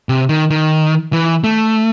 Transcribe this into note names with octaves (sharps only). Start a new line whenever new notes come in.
C3
D#3
D#3
E3
A3